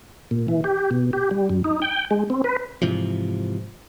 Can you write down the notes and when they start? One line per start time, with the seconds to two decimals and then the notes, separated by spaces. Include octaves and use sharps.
0.31 A#2
0.48 E3
0.64 G4
0.91 B2
1.13 G4
1.31 G3
1.50 F#2
1.64 D#4
1.82 G5
2.11 G#3
2.30 C4
2.44 B4
2.82 G#2 C3 E3 F3